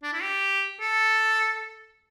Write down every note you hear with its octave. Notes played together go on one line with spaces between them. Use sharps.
D4
E4
G4
A4